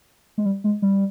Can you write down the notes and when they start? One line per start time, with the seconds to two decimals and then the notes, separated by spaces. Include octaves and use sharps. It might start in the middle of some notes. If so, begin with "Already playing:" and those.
0.38 G#3
0.45 G3
0.64 G#3
0.82 G3